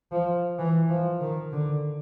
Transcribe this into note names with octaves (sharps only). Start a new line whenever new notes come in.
F3
E3
F3
D#3
D3